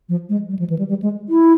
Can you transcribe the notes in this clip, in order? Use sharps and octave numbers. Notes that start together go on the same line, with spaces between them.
F3
G#3
G3
F3
E3
G3
G3
G#3
E4